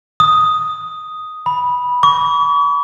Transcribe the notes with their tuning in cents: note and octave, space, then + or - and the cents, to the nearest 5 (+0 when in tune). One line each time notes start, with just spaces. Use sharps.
D#6 +0
B5 -10
C#6 +45